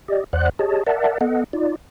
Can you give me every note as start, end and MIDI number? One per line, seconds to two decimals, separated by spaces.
0.08 0.24 67
0.08 0.24 74
0.08 0.24 75
0.33 0.49 40
0.33 0.49 72
0.33 0.49 74
0.33 0.49 78
0.33 0.49 90
0.59 0.83 67
0.59 0.83 68
0.59 0.83 73
0.59 0.83 75
0.59 0.83 81
0.87 1.18 70
0.87 1.18 74
0.87 1.18 76
0.87 1.18 78
0.87 1.18 81
1.21 1.44 59
1.21 1.44 69
1.21 1.44 75
1.21 1.44 78
1.53 1.76 63
1.53 1.76 65
1.53 1.76 74